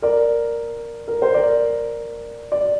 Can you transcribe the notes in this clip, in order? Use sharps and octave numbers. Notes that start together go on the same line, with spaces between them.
A#4 D5
A#4
C5
A#4 D5
D5